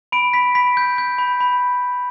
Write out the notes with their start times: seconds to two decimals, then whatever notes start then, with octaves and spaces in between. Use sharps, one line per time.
0.12 B5 D7
0.34 B5 B6
0.55 B5 B6
0.77 G6
0.98 G6
1.18 B5
1.41 B5